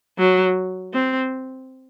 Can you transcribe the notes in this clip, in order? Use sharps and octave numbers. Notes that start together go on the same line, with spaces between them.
F#3
C4